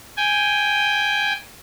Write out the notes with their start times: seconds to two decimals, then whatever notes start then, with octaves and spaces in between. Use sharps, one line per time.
0.17 G5 G#5